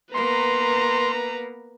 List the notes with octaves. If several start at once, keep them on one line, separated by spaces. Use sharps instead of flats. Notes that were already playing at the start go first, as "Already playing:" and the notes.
A#3 B3 B4 A#5 C6